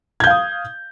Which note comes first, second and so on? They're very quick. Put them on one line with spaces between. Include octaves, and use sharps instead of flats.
G#6 G6 F5 D#6